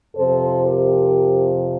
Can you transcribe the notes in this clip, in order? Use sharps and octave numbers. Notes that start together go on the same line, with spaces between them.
F2 C3 F3 A4 C5
G4 A#4